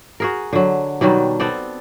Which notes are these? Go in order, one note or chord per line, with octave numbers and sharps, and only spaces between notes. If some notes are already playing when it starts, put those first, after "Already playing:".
F#4 G#4 A#4
D3 F#3
B2 D#3 F#3 G3
B3 C4 A4 D5